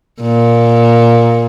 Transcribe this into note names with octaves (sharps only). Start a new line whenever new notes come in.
A#2